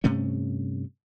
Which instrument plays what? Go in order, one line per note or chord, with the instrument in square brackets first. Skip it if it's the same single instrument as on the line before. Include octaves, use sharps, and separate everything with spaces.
[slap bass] G2 C3 A3 C#4